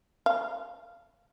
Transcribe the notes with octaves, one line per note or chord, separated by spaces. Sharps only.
F5